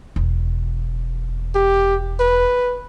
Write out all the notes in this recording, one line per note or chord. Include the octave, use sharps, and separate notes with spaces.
E1
G4
B4